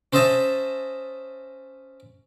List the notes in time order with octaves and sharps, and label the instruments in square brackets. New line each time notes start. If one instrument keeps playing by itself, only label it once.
[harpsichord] C#4 C5 D#5 E5 A5